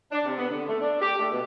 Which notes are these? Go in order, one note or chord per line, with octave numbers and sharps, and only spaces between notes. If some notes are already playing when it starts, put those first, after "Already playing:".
D4
C3
B3
D3
A3
D4
G4
A3
B2